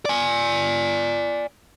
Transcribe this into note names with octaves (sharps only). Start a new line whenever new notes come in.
D5 G#5